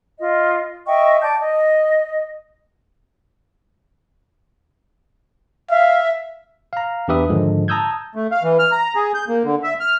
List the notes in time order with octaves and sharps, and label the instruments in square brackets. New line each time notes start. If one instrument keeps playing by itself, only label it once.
[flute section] F4 D#5
D#5 E5 G5 C#6
D5 A5 G6
D#5
[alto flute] E5 [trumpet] F5
[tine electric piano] F5 A#5
E2 D4 G4 B4 E5 D#6
G#2 D3 D#3 F3 G#3
A5 A#5 D#6 E6 G6 G#6
[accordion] A3
F5
E3
F6
A#5
G#4
G6
A#3
D3
E5
F6